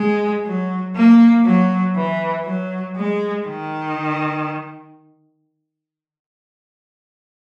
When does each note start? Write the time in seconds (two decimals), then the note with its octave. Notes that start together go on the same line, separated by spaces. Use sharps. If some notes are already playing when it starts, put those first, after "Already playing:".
Already playing: G#3
0.45 F#3
0.96 A#3
1.45 F#3
1.96 E3
2.45 F#3
2.96 G#3
3.47 D#3